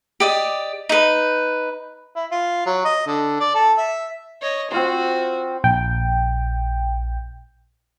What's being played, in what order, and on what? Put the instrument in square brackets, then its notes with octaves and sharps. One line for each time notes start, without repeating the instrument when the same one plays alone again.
[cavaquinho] G4 D5 D#5
D#4 B4
[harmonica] E4
F4
F#3
D#5
D3
D5
A4
E5
[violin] C#5 D#5
[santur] C4 F4 C6 [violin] F#4
[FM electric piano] A#1 G5